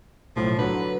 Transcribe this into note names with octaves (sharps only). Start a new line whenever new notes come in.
B1 A2 F3
D3 F#3 B4